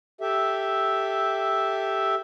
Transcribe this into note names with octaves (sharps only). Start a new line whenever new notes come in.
G4 A4 E5